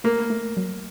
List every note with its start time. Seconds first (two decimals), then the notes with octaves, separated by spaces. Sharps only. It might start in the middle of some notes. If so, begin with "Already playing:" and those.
0.04 A3 A#3
0.30 A3
0.57 F#3